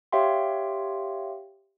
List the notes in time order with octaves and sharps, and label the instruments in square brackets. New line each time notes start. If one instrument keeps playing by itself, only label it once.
[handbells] G4 C#5 E5 F5 G5 C6